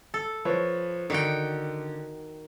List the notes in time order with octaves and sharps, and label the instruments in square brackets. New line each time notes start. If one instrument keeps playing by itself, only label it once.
[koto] A4
[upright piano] F3 B4 C#5
[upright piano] D3 [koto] D#3 F#4 G5